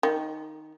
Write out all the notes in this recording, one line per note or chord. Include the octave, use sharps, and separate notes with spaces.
D#3